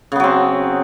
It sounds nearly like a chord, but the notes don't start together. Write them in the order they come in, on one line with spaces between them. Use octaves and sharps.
C#3 B3 F#3 C4